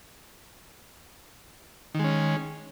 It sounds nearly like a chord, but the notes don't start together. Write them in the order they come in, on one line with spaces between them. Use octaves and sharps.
D#3 G#3 C#4